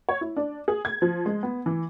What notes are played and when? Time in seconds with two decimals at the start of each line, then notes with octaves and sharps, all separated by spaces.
0.09 C#5
0.21 E4
0.37 D4
0.68 G#4
0.85 G#6
1.02 F3
1.26 G#3
1.43 B3
1.66 E3